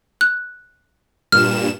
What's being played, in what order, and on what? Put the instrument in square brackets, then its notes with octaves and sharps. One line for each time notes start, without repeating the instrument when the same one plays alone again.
[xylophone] F#6
[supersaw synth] G2 A#2 E7 [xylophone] F6